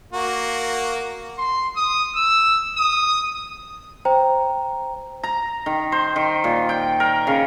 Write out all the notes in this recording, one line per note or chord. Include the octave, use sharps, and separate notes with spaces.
A#3 F#4
C6
D#6
E6
D#6
C5 G5 A#5
A#5
D#3
C5
D#3
A#2
G5
A#4
C#3